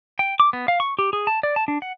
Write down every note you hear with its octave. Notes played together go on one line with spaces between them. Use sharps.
G5
D6
B3
F5
C#6
G4
G#4
A5
D5
A5
D4
F#5